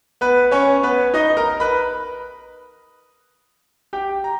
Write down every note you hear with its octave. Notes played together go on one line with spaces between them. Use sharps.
B3 B4
C#4 C#5
B3 B4
D#4 D#5
A#4 A#5
B4 B5
G4 G5
A#5